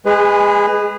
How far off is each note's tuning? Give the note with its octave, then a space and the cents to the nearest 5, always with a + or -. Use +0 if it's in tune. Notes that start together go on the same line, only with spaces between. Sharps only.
G#3 +0 G#4 -30 B4 +10